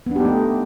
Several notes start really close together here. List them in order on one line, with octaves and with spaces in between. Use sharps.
B3 D4 G4 D#4 A3